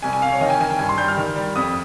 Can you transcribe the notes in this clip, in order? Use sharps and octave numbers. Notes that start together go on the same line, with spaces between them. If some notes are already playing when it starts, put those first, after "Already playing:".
C2 G#5
G#5
C2 F5
C#5
D#3 D#5
G5
G#5
D#3 G#5
G5
G2 G#5
C6
G3 G6
F6
D#3
G3
F2 D#6